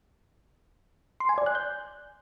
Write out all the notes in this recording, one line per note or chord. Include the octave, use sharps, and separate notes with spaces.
C6
G#5
D5
F#6
G6